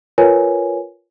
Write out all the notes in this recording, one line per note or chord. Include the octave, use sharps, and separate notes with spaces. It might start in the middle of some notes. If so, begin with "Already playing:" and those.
F4 A#4 B4 C#5 G#5